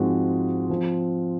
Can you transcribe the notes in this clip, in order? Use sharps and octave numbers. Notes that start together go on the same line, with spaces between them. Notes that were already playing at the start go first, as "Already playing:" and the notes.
Already playing: G#2 F3 G#3 C4 F#4
F3 C4